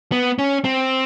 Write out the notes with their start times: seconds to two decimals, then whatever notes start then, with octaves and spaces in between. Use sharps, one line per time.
0.12 B3
0.39 C#4
0.64 C4